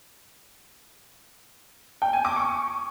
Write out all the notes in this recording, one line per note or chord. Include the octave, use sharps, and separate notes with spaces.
G5
G#5
D6
C#6